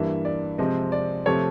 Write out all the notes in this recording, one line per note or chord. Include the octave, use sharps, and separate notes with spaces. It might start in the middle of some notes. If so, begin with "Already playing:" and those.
Already playing: G2 E3 G3 A#3 E5
D5
C3 F3 G#3 C4 D#5
D5
C3 F3 A3 C#5